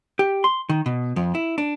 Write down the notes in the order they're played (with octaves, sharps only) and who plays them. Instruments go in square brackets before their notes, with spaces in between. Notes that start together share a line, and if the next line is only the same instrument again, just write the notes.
[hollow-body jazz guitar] G4
C6
D#3
B2
F2
E4
D4